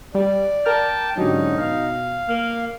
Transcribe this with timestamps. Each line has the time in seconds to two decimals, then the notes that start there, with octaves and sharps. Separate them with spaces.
0.15 G3 D5
0.66 A#4 G5 A5 D6 F6
1.18 G#2 D3 F#3 C#4 D#4 F#4 G4
1.58 B2 F5
2.29 A#3 F6